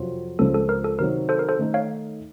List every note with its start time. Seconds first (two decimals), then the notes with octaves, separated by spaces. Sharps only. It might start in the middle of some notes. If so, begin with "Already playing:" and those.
Already playing: F2 C3 F#3 C4 F4
0.39 C#2 C#3 F3 C4 A4
0.54 A4
0.69 A#4
0.84 A4
0.99 C3 D#3 F#3 C4 A#4
1.29 A4 C5
1.39 A#4
1.49 A4 C5
1.59 D#3 A3 D#4
1.74 C#5 F5